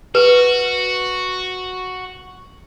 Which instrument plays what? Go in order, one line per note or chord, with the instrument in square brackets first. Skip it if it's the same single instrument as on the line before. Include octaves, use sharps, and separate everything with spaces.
[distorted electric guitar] F#4 [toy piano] B4